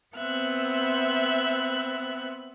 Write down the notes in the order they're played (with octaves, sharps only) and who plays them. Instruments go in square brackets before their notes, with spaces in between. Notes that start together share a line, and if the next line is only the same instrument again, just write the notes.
[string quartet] B3 C4 E5 F#6